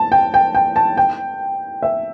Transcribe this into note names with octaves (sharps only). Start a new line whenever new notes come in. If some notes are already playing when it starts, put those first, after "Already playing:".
Already playing: A5
G5
G5
G5
A5
G5
E5